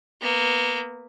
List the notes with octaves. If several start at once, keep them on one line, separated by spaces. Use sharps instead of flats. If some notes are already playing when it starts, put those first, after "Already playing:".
A#3 B3